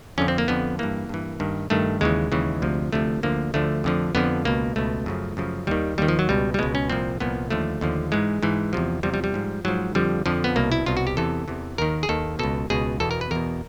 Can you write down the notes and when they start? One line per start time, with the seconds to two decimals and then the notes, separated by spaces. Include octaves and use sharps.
0.18 F2 D3 F3 C#4
0.28 C4
0.38 A#3
0.48 F2 D3 F3 B3
0.79 G2 E3 A#3
1.09 G2 E3
1.40 G2 D#3
1.70 G2 D#3 A3
2.01 D#2 C#3 E3 G#3
2.32 D#2 C#3 E3
2.62 D2 C3 F3
2.93 D2 C3 F3 A3
3.23 D2 D3 F3 A#3
3.54 D2 D3 F3 A3
3.84 F2 D3 F3
4.15 F2 D3 F3 B3
4.45 C#2 B2 A#3
4.76 C#2 B2 A3
5.06 F#2 C#3 F3
5.37 F#2 C#3 F3
5.67 D#2 D#3 G3
5.98 D#2 D#3 G3
6.08 F3
6.19 F#3
6.29 C#2 B2 G3
6.54 G3
6.59 C#2 B2 G#3
6.75 C#4
6.90 C2 A#2 F3 C4
7.20 C2 A#2 F3 B3
7.51 D#2 D3 F3 A3
7.81 D#2 D3 F3
8.12 G#2 E3 G#3
8.43 G#2 E3
8.73 E2 C3 F3
9.03 E2 C3 F3 G3
9.14 G3
9.24 G3
9.34 G#2 F3
9.65 G#2 F3 F#3
9.95 F2 D3 F3 G3
10.26 F2 D3 F3
10.44 B3
10.56 C2 B2 A#3
10.72 E4
10.86 C2 B2 F4
10.97 F#4
11.07 G4
11.17 E2 C3 E3 A4
11.48 E2 C3 E3
11.78 D#2 D#3 A#4
12.03 G#4
12.09 D#2 D#3 A4
12.39 C#2 B2 A4
12.70 C#2 B2 G#4
13.00 E2 B2 A4
13.11 A#4
13.21 B4
13.31 E2 B2 A#4